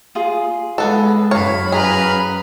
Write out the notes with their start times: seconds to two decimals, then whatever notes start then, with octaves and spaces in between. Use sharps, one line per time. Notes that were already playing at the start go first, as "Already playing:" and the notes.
0.15 F4 G#4
0.78 G#3 B3 A4
1.31 F#2 C#5 F5 B5
1.72 G#4 A#4 B4 F6